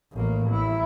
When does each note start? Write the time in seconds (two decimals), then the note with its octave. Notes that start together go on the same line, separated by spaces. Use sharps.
0.13 A1 A#3
0.50 E4